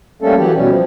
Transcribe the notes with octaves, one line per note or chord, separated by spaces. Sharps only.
G3 A3 A#3 C#4 A4
E3 F#3 G4
B2 G3 C#4
F3